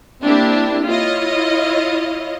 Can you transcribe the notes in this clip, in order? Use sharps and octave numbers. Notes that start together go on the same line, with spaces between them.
A#3 C4 D4 E4 G4
E4 F4 C#5 D#5